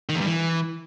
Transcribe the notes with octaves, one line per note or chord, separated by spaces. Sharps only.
D#3
E2
G2
E3